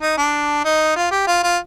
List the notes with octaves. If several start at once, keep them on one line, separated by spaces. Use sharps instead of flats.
D#4
D4
D#4
F4
G4
F4
F4